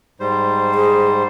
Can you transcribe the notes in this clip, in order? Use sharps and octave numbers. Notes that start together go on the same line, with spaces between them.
G#2 G3 C5
G#4